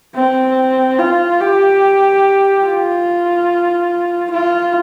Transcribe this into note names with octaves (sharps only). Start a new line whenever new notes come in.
C4
F4
G4
F4
F4